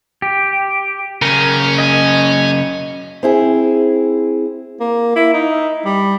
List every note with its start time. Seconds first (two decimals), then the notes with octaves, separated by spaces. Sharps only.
0.22 G4
1.22 F#2 C#3 C#4 A#4
1.78 D#5 G#5
3.23 C4 E4 G#4
4.80 A#3
5.16 E4
5.34 D#4
5.85 G3